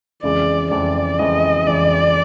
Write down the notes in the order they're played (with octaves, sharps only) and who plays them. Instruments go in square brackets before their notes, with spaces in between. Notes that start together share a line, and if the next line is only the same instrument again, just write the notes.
[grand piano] F2 C#3 E3 G#3 [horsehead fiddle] D5
[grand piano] F2 C#3 E3 G#3 [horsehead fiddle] D5
[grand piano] F2 C#3 E3 G#3 [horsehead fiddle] D#5
[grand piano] F2 C#3 E3 G#3 [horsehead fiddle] D5